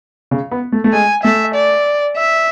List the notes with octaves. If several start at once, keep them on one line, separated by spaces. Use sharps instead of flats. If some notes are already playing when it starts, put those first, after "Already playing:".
C#3
B3
A3
A3
G#3 G#5
A3 E5
D5
E5